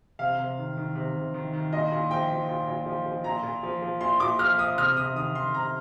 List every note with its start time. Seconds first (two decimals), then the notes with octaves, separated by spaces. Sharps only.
0.19 C3 F5
0.38 C3
0.58 D#3
0.77 D#3
0.95 C3
1.16 C3
1.34 D#3
1.53 D#3
1.72 A#2 D#5
1.92 A#2
2.11 F3 G5
2.30 F3
2.49 A#2
2.68 A#2
2.86 F3
3.06 F3
3.24 A#2 A#5
3.43 A#2
3.63 F3
3.82 F3
4.01 A#2 C6
4.20 A#2 D6
4.39 F3 F6
4.58 F3 D#6
4.78 C3 F6
4.97 C3 D#6
5.15 D#3 D#6
5.34 D#3 C6
5.54 C3 A#5